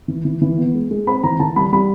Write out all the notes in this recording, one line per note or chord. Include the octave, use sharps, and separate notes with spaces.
E3
E3
E3
B3
G#3
G#3
C4 B5
E3 A#5
E3 A5
G3 B5
G3 B5